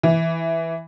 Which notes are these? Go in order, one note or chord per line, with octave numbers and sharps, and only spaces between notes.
E3